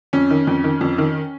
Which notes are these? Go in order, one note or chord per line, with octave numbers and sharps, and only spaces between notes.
F2 C#4
D#3
F2
D#3
F2
D#3